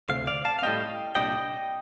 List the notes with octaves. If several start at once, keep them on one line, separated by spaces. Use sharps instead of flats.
D2 C3 F5
D5 F5
F5 A5
F5
A2 G3 C4 D#5 G5
C2 A#2 G3 D4 D#5 G5